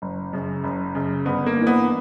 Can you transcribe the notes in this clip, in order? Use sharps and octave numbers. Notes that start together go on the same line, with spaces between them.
F#1
F#2 C#3
F#1
F#2 C#3
G1 B3
A#3
G2 E3
B3